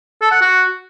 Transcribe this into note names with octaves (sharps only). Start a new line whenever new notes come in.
A4
F#5
F#4